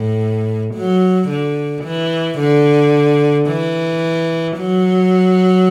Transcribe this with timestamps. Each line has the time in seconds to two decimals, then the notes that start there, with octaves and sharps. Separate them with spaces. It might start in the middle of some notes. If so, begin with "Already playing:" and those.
Already playing: A2
0.75 F#3
1.29 D3
1.84 E3
2.39 D3
3.48 E3
4.58 F#3